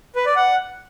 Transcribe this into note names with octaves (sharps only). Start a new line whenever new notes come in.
B4
D5
F#5